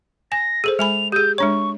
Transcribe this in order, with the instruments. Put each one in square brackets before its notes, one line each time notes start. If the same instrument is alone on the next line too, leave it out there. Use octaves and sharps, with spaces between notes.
[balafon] G#5 [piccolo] A#6
[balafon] G#4 A4 C5
[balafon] G#3 G#5 B5 [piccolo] F7
[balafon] G4 G#4 [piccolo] G6
[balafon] G#3 D4 C#5 [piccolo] C#6